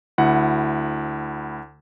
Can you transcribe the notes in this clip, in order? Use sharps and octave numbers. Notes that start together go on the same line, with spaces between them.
D2 E4 F#5